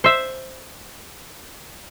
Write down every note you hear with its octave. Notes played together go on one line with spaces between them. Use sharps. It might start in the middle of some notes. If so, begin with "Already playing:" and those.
C5 E5